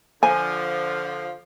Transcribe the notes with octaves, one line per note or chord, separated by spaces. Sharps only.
D3 F3 G#5